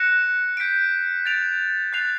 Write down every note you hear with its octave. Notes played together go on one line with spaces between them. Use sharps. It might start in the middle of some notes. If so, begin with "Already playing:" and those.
Already playing: F#6 A#6 C#7 E7
G6 B6 D7
A6 D7 F7
F#6 A6 C7 F7